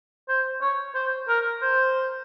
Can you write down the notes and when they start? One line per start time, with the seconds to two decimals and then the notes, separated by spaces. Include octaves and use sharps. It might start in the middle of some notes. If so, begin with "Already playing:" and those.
0.29 C5
0.62 C#5
0.95 C5
1.29 A#4
1.62 C5